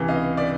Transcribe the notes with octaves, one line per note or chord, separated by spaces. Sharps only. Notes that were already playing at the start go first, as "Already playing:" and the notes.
Already playing: C#2 C3 E3
D#5 F5
D5 E5